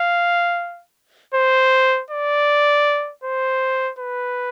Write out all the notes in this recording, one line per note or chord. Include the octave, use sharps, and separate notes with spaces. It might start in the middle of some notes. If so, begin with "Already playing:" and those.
Already playing: F5
C5
D5
C5
B4